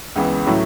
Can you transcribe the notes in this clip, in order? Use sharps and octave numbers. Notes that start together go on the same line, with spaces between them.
C#2 C#3 E3 B3
A2 F#3 A3 C#4 E4